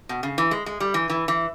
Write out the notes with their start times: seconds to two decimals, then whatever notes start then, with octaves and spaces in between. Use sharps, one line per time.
0.09 B2
0.23 C#3
0.38 E3
0.51 G#3
0.66 G#3
0.80 G3
0.94 E3
1.10 E3
1.28 E3